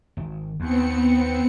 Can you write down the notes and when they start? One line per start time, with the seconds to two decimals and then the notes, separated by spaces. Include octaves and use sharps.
0.17 G#1
0.60 D#2 B3 C4 C#7